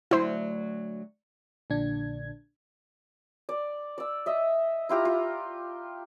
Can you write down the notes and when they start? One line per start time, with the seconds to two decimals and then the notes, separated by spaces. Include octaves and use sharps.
0.11 D2 F#3 E4 C5
1.70 A#1 A#2 D3 D4 G#6
3.49 D5
3.98 D5 E6
4.26 D#5 E5
4.89 E4 F4 G4 A#5
5.05 F4